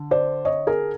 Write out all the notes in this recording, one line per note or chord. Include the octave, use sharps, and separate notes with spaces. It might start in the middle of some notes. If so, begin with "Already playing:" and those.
Already playing: D3
C5 D5
C#5 D#5
G#4 A#4